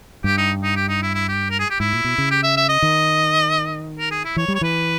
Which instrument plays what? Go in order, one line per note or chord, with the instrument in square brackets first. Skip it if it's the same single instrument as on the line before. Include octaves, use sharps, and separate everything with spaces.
[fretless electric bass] G2 [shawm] G4
[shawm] D#4
D#4
G4
D#4
E4
E4
G4
A#4
G#4
G4
[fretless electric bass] G#2 [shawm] E4
[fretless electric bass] A#2
B2
C#3
[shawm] G4
E5
E5
D#5
[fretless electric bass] D#3
[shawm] A#4
G#4
E4
[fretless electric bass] E3 [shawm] C#5
[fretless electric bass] G3
[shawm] C#5
[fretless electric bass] E3 [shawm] B4